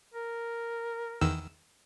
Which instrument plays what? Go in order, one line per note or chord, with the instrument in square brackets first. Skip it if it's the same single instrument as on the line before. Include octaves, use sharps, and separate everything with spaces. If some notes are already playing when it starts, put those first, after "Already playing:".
[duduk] A#4
[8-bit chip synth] E2 D#3 E6